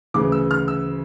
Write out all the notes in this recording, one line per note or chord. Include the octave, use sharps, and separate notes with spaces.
D2 C#3 E3 D6
E6
F6
E6